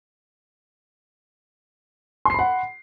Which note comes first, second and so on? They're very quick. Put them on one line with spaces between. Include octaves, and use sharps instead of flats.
C6 C7 B5 F#5